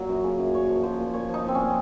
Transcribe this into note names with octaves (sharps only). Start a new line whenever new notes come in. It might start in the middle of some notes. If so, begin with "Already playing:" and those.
Already playing: A#2 F#3 A#4
F#2
C#3
F#2
A#2 C#5
F3
F3 C5
A#2
A#2 C#5
F3 D#4
F3 C4
C#4
A#2